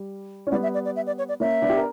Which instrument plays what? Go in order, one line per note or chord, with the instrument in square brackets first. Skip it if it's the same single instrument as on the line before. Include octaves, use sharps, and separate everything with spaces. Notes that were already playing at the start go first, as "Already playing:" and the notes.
Already playing: [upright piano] G3
C#4
[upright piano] G3 B3 [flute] D5
[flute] E5
D5
D5
E5
D5
C#5
D5
[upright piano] A#3 C#4 [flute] E5
[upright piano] B3 D4
G4
A#4